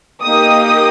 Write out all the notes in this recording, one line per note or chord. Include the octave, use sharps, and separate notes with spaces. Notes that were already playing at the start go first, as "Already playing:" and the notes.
A#3 D#4 G4 D#6